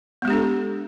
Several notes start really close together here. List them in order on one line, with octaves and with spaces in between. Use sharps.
B3 G#3 G4 D4 A4